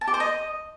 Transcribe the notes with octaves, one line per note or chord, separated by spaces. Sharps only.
A5
G4
C5
D#5